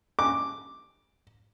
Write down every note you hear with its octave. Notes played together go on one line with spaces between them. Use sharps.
D6